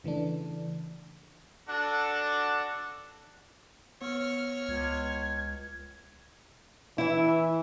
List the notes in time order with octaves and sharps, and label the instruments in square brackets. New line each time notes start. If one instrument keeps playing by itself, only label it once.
[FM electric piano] C#3 E3 A3 D4
[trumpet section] D4 F#4 A4 F#5
[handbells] B3 [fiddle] C#5 F6
[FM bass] C#2 [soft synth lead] G#6
[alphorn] E3 [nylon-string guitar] E4 E5